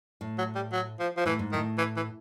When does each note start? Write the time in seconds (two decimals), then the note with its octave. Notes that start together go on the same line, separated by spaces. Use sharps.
0.21 A2
0.38 F#3
0.55 G3
0.73 F#3
1.00 F3
1.17 F3
1.25 A2 E3
1.39 G#2
1.52 A2 D#3
1.78 E3
1.96 E3